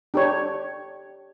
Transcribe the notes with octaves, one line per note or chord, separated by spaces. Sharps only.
D4 G4 C#5